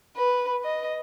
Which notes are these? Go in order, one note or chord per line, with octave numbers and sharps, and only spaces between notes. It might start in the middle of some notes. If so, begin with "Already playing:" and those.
B4
D#5